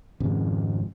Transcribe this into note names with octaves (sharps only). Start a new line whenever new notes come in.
G#1 F2 C#3